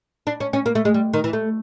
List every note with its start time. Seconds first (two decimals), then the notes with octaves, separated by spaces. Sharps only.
0.27 D4
0.40 C#4
0.53 C#4
0.66 A#3
0.75 A3
0.85 G#3
0.94 G3
1.14 D#3
1.24 E3
1.33 A3